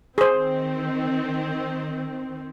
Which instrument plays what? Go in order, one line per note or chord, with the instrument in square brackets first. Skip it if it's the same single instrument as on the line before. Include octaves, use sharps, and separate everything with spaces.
[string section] D#3 C4 [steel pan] G#4 C5